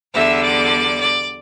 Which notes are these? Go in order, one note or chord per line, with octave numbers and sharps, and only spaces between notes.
E2 D3 G3 E5
D5
D5